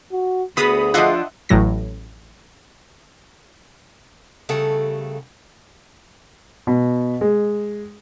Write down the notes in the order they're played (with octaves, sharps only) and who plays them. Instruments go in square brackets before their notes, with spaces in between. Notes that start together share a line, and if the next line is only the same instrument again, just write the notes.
[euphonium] F#4
[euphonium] D2 [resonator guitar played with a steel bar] B3 F#4 [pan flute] G#4 [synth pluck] B5 D#6
[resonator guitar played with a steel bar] F3 D4 F4 [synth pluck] D#5 E5 F#5
[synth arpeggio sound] A1 A2 F#3 A#6
[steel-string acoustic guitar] D#2 C#3 G3 A3 A4 F#5
[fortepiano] B2
G#3